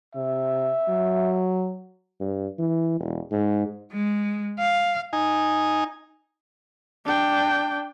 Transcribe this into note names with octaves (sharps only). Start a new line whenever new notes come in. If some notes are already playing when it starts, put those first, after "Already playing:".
C3 E5
F#3
G2
E3
E1
G#2
G#3
F5
D#4 G#5
D4 G5